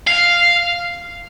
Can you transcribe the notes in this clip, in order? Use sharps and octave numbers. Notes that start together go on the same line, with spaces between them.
F5